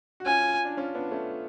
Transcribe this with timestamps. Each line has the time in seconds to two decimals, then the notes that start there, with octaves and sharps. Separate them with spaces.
0.20 F#4
0.26 C#4 F4 G#5
0.65 D4
0.77 C#4 F4
0.95 B3 D4
1.11 A3 C#4